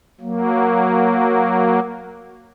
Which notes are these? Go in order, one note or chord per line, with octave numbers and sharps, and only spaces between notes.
F#3 A#3